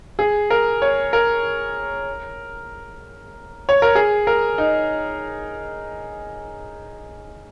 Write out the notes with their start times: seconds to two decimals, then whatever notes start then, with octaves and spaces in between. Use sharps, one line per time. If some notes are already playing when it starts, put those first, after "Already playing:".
0.19 G#4
0.50 A#4
0.82 C#5
1.13 A#4
3.69 C#5
3.82 A#4
3.95 G#4
4.27 A#4
4.58 D#4